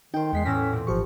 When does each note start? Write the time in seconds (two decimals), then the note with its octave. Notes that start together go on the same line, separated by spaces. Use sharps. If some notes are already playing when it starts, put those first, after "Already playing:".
0.14 D#3 D#4 C5 G5
0.33 E2 G#3 B3 B6 C7
0.45 E2 A2 C#4 E6 A#6 B6
0.73 A#2 C4
0.87 G#1 G#2 F3 G4 C#6